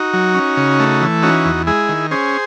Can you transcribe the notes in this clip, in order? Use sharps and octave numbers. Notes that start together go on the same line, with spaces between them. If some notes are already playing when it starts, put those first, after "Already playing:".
Already playing: D#4 F#4
F#3
C#4
C#3
A3
E3
C#4 D#4 F#4
E2
G#3 E4 G#4
D#3
C#4 G#4 C5